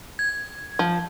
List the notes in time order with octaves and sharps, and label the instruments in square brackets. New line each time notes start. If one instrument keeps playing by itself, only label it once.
[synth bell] G#6
[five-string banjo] F3